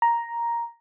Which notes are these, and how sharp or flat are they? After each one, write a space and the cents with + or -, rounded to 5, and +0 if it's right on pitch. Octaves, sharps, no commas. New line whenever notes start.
A#5 +5